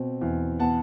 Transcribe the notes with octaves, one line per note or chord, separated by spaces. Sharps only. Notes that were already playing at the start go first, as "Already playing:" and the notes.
Already playing: B2 C4
E2
B3 F#5 A5